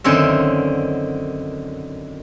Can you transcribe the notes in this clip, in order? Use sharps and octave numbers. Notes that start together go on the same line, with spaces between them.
F#2 D3 D#3 C4 C#5 E5